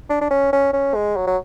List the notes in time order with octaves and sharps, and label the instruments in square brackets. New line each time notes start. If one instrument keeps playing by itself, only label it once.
[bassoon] D4
D4
C#4
C#4
C#4
G#3
F#3
F#3